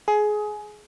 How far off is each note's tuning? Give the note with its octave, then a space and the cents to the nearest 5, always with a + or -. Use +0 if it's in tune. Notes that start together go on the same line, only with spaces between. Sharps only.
G#4 +20